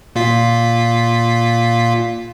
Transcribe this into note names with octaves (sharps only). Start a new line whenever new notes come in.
A#2 F4 B6